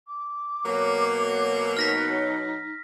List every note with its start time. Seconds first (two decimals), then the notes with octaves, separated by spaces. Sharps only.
0.07 D6
0.65 B2 F#3 A#3
1.77 D#4 F6 A#6 B6